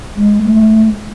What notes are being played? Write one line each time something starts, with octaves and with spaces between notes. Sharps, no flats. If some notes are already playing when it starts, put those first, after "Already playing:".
G#3
A3